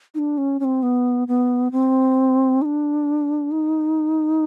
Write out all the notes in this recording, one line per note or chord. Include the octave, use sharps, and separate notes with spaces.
D#4
D4
C#4
C#4
C4
B3
B3
C4
D#4
D4
D#4